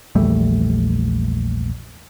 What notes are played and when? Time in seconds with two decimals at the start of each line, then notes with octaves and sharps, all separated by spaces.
0.15 A#1 E2 G3 A3